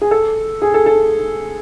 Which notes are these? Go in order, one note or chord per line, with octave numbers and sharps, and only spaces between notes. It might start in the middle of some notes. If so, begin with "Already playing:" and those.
G#4
A4
G#4
A4
A4